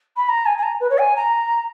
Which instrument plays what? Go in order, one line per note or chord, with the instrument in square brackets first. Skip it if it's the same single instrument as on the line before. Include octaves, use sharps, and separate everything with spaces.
[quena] B5
A#5
G#5
G#5
A#5
B4
C#5
G#5
A#5